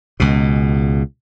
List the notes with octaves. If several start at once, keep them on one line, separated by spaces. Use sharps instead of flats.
C#2 B2